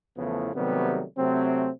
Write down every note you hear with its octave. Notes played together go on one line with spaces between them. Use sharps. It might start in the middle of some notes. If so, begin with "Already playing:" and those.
E2 C#3 E3 F3 A3 B3
C3 D#3 F#3 G3 A3 B3
C3 F#3 A3 C4